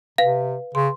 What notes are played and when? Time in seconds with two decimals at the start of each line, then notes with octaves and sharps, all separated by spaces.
0.18 C3 B4 F5
0.75 C#3 C6